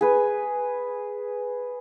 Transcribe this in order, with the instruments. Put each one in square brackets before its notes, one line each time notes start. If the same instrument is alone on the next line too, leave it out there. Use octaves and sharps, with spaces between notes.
[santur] G#4 B4